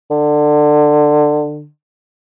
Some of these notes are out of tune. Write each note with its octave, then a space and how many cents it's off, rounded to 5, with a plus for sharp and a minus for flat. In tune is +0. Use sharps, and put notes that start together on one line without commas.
D3 +20